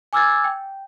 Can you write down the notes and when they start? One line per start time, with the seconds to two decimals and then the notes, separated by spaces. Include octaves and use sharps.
0.13 G#5 D6 E6 F6 G#6 A6
0.44 G5